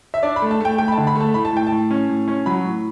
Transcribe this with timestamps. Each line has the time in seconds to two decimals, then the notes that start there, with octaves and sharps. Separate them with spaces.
0.14 E5
0.23 D4 D5
0.36 B5
0.42 A3
0.51 A5
0.60 A3 G5
0.78 A3 G5
0.88 B5
0.92 A5
0.98 D3
1.07 B5
1.15 A3
1.21 A5
1.34 A2 B5
1.45 A5
1.53 A2 G5
1.67 A5
1.72 A2
1.91 C#4
2.09 A2
2.28 C#4
2.46 F#3 B5
2.64 A2